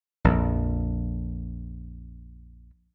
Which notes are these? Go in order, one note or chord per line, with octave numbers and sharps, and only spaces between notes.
A#1 F2